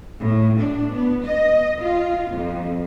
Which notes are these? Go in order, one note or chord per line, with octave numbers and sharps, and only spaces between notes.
A2
D4
B3
D#5
F4
F2